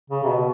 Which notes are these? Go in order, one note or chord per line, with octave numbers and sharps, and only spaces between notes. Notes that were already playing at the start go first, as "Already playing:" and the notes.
C#3
C3
B2